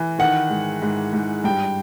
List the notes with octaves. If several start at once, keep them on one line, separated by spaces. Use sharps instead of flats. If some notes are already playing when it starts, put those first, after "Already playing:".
Already playing: E3
D#3 F#5
G#2
G#2
G#2
G2 G5